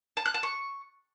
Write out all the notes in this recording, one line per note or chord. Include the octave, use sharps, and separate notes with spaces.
A5
F#6
A5
C#6